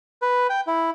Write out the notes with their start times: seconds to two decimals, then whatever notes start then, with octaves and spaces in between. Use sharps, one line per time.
0.22 B4
0.50 G5
0.67 E4